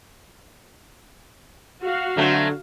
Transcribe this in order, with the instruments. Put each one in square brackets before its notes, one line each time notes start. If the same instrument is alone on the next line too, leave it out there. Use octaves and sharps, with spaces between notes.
[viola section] F#4 F5
[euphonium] D3 [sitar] F#3 A3 C4